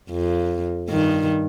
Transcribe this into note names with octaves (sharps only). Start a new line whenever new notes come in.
F2
G2 D#3